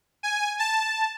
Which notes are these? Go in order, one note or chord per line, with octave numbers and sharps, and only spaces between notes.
G#5
A5